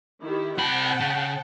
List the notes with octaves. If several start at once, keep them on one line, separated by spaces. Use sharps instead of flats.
D#3 E4 G4
C3 F#5 G5 A5 B5
C#3